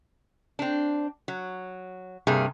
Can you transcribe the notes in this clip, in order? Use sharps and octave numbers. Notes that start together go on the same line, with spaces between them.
C4 D4
F#3
G2 C3 G3 A#3 G#4